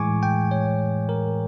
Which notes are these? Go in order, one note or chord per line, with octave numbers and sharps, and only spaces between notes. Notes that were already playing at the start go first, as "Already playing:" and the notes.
Already playing: A2 E3 G#3 G#5 C#6 D6
G5
C#5
A#4